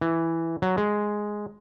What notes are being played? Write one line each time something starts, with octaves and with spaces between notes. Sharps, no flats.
E3
F#3
G#3